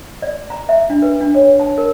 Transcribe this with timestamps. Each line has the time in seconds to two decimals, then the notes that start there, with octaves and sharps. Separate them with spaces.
0.22 D5
0.50 A#5
0.69 E5
0.90 D4
1.02 B4
1.21 D4
1.35 C#5
1.60 A5
1.78 A#4